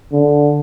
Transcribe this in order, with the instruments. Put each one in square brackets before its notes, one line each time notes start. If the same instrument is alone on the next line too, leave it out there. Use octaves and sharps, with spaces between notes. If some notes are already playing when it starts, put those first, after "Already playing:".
[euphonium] D3